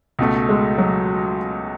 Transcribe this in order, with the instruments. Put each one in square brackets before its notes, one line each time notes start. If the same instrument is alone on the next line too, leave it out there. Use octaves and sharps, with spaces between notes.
[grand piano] C#2 B2 A3
[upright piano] G#3
F#3